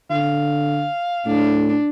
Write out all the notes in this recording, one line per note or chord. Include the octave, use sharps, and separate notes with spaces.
D3 F5
A2 D4